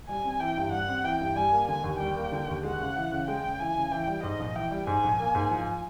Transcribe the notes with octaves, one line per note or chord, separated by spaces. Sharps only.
G3 G#5
C4
E3 G5
G2
G3 F#5
C4
E3 G5
G2
G3 G#5
A#3
D3 G#5
D#2
G3 G5
A#3
D3
D#2
G#3 F#5
C#3
E3
C#3
G#3 G5
C#3
E3 G#5
C#3
E3 G5
G3
G#2 D#5
A#1
E3 G5
G3
G#2 G#5
A#1
A#3
G#2
F3